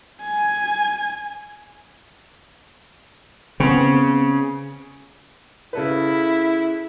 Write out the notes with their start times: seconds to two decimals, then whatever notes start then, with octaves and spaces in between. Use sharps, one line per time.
0.22 G#5
3.60 C#3 B3 C4
5.73 C#3 E4 A4 B4